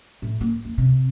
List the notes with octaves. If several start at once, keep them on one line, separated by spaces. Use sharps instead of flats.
A2
A#3
E2
C3